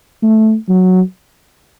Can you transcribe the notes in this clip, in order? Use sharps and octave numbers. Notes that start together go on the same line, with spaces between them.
A3
F#3